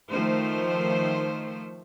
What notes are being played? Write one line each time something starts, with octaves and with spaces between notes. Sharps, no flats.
D#3 F3 A3 C5